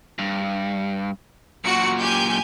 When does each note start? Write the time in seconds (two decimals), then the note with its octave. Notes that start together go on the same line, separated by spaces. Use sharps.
0.19 G2
1.65 F#2 A#2 F#4 C#7
1.99 G4 G#5 G6